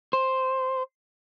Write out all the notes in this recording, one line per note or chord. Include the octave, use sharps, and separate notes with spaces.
C5